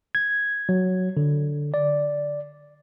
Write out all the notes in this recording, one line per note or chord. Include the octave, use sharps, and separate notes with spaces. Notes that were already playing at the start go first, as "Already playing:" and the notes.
G#6
F#3
D3
D5